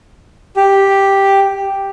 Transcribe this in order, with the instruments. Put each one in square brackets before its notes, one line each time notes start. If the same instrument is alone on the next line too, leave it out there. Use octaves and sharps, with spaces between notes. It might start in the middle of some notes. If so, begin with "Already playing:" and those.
[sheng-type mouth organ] G4